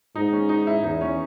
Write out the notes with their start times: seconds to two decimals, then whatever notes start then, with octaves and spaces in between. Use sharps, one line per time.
0.15 G#2 D#4
0.33 C#4
0.49 D#4
0.67 E4
0.84 E2 D#4
1.01 C#4